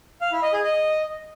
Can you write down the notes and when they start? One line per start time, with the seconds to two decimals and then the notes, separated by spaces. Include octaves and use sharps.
0.21 F5
0.32 E4
0.43 D#5
0.53 G#4
0.64 D#5